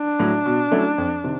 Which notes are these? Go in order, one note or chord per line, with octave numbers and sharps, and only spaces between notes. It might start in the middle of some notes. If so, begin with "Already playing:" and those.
Already playing: D4
A2 F#3
B2
F#3 A3 C#4 E4
F2
C3 D#3